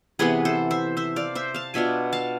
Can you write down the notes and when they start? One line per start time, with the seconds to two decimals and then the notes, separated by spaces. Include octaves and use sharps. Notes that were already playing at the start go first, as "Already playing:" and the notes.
0.19 C3 E3 B3 G#4 B4
0.45 A4 C5
0.71 C5 E5
0.97 C5 E5
1.16 D5 F5
1.35 C5 E5
1.54 F5 A5
1.74 B2 B3 D4 F4 E5 G#5
2.13 F5 A5